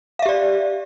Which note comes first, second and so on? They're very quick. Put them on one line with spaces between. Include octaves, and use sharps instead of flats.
F5 E5 G4 D5